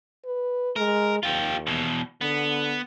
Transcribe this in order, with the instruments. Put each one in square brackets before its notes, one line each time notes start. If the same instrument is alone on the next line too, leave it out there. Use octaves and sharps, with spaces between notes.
[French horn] B4
[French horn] G#3 [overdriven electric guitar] A#4
[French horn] D#2 [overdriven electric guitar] F4 G4
[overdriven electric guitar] E2 B2
[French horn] D3 [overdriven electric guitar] B3